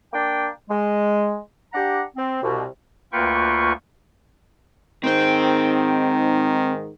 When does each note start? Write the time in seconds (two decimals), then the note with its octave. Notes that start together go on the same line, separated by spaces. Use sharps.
0.13 A#3 D4 G5
0.69 G#3
1.73 D4 G4 F#5 A#5
2.16 C4
2.43 C2 B2
3.12 D2 A#3 F4 B4 G5 C#6
5.04 G#2 D#3 C4 C5